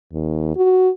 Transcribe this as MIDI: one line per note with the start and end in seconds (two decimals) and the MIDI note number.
0.13 0.56 39
0.57 0.90 66